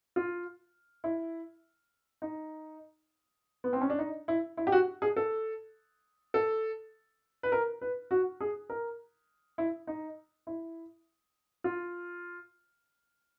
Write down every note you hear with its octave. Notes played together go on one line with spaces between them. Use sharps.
F4
E4
D#4
B3
C4
C#4
D4
D#4
E4
E4
G4
F#4
G#4
A4
A4
B4
A#4
B4
F#4
G#4
A#4
E4
D#4
E4
F4